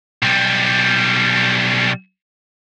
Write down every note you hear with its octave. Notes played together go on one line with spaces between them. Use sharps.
B1 G3